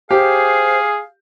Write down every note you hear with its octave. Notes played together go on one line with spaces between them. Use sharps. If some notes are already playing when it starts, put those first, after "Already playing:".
G4 G#4 C5 F5